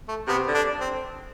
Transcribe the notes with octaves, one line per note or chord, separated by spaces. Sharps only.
A3
C3 B3
D3
D4
C4